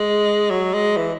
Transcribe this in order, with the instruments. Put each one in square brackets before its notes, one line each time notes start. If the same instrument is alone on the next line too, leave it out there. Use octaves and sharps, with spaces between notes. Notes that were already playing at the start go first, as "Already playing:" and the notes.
Already playing: [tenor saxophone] G#3
F#3
G#3
E3